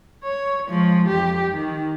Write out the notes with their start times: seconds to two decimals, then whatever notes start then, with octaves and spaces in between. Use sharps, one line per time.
0.24 C#5
0.69 F3 G#3
1.07 F2 G4
1.53 D#3